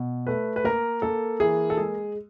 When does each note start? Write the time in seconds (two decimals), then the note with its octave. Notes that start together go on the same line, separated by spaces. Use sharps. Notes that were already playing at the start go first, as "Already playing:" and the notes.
Already playing: B2
0.27 A3 B4
0.56 B4
0.64 A#3 A#4
1.02 A#3 A4
1.40 E3 G#4
1.70 A4
1.78 G#3 G#4